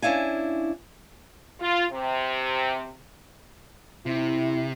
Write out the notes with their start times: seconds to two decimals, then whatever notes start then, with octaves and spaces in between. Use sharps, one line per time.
0.02 C#4 D4 E4 F5 G#5
1.60 F4
1.92 C3
4.06 C3 E4